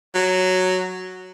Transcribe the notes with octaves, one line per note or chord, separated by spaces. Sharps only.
F#3